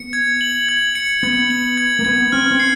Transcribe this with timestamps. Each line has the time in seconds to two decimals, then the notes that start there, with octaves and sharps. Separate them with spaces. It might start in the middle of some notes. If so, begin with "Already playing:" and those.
Already playing: B3 C#7
0.13 G#6
0.41 F#7
0.69 G#6
0.95 C#7
1.23 B3 G#6
1.50 F#7
1.77 G#6
1.99 A#3
2.05 B3 G#6
2.32 C4 F6
2.51 C4
2.60 C7